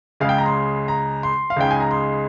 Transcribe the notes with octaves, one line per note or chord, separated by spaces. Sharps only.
C#2 C#3 G#3 F5
G5
A#5
C6
A#5
C6
F5
C#2 C#3 G#3 D#4 G5
G#5
A#5
C6